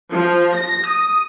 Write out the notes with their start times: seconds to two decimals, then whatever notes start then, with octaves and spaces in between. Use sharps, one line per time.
0.11 F3
0.56 A#6
0.88 D#6